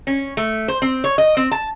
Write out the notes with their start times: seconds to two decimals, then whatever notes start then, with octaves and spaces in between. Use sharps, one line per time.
0.07 C#4
0.37 A3
0.68 C5
0.82 C4
1.04 C#5
1.18 D#5
1.37 C4
1.51 A5